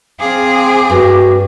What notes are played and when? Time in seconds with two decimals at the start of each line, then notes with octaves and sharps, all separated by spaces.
0.20 C4 G#4 F5 D6
0.90 G2 F#4